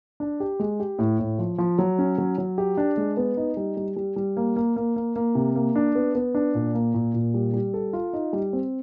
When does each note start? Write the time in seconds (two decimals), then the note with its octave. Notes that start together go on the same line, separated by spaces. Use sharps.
0.20 D4
0.40 G4
0.59 G#3
0.80 G4
0.99 A2
1.19 A2
1.39 F3
1.58 F3
1.78 F#3
1.99 C#4
2.18 F#3
2.38 F#3
2.58 G4
2.78 D4
2.97 G#3
3.17 B3
3.37 D#4
3.57 G3
3.77 G3
3.96 G3
4.16 G3
4.37 A#3
4.56 A#3
4.76 A#3
4.96 A#3
5.16 A#3
5.35 C3
5.55 A#3
5.75 D4
5.95 B3
6.15 B3
6.35 D4
6.54 A#2
6.74 A#3
6.94 A#2
7.14 A#2
7.34 G3
7.53 G3
7.74 A4
7.93 F4
8.13 D#4
8.33 G3
8.53 C4